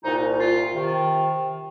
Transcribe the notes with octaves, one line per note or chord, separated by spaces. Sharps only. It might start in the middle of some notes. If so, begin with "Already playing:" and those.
C2 A#2 D#4
F4
C3 D#3